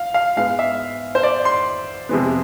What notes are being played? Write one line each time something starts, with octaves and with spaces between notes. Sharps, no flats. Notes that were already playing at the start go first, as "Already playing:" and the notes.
Already playing: F5
F5
G#2 G#3 B3 F5
E5
C5
D5
C6
F2 C3 G#3 B3